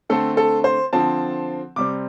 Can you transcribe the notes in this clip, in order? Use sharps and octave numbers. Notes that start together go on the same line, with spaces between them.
D3 A3 C4 A4
A4
C5
D3 F3 C4 A5
C3 G3 C4 D6